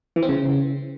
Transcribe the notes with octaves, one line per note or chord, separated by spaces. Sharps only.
E3
C4
C#3